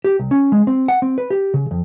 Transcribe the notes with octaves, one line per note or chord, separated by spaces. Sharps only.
G4
C2
C#4
G#3
C4
F#5
C4
B4
G4
C#3
F2